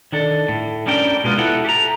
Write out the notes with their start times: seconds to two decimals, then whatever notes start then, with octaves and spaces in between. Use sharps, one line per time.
0.12 D#3 D4 A4
0.48 A2
0.87 G3 C#4 D4 A#4 G5
1.24 B2 G#3 B3 F4
1.38 E4 F#4 G4 A4 F#5
1.65 G4 A4 A#5